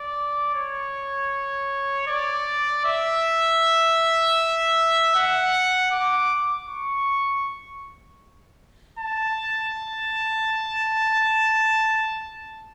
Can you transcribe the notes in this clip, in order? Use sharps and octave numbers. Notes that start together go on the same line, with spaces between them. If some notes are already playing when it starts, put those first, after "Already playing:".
Already playing: D5
C#5
D5
E5
F#5
D6
C#6
A5